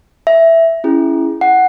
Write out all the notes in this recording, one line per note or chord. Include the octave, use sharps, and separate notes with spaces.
E5
C#4 E4 G#4
F#5